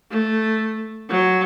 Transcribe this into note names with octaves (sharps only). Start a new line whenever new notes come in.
A3
F#3